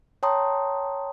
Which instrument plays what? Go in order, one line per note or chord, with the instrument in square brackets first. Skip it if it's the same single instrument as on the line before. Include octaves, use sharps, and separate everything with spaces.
[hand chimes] C#5 G5 A5 A#5 C6 D#6